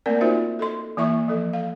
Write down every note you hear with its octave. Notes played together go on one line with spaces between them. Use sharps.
A3 A#3 C4 A#4 D5
D#4 F4 F#4 C5 E5
A4 D#5 C6
E3 A#3 E4 E5 C#6
F3 A4
F5